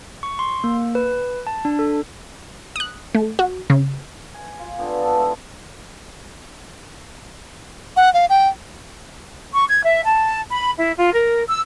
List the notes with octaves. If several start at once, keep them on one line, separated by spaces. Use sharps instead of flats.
C#6
C6
A#3
B4
A5
D4
A4
D#6 F#6
A3
F#4
C#3
G#5
F4
D3 B3 F4 D5
B3 D4 F#4 A4
G#3 E4 F4
F#5
F5
G5
C#6
G#6
E5
A5
B5
E4
F4
A#4
E6